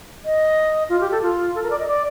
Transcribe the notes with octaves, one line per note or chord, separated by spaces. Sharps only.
D#5
F4
G4
A4
F4
A4
A#4
D5
D#5
D5